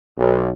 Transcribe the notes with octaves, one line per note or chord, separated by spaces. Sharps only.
B1